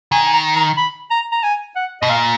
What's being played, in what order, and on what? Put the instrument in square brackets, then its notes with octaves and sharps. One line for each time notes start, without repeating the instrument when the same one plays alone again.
[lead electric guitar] D#3 [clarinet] G#5
[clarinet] G#5
A#5
A#5
B5
A#5
A#5
G#5
F#5
[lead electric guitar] B2 [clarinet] D#5
[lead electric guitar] A#2 [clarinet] F5